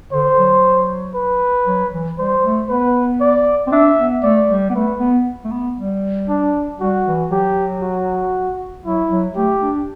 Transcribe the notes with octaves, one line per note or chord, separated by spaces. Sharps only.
D3 C5
F#3
B4
F#3
E3
G3 C5
A3
B3 B4
D5
C4
D4 E5
B3
A3 D5
G3
B3
A3 B4
B3
A3
B3
G3
D4
G3 F#4
E3
F#3 G4
F#4
F#3 E4
F#3
A3 G4
D4